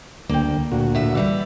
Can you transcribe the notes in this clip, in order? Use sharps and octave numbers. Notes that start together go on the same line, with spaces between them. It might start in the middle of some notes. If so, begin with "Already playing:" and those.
D2 A#3 G5
D2 A#2 F#4
A2 E5
E3 G3 E5